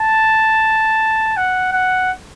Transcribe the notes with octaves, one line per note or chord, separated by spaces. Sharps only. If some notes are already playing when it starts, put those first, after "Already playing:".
Already playing: A5
F#5
F#5